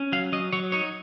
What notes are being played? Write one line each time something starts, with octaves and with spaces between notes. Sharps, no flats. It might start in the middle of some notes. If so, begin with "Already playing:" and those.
Already playing: C#4
F#3 F5
F#3 D#5
F#3 C#5
D#4 C#5